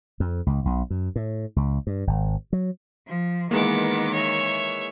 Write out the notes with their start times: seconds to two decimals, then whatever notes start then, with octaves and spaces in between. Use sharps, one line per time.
0.20 F2
0.47 C#2
0.65 B1
0.90 F#2
1.16 A2
1.56 C#2
1.87 G2
2.07 G#1
2.53 F#3
3.07 F3
3.51 D#3 E3 G#3 A#3 B3 D6
4.12 C#5 E5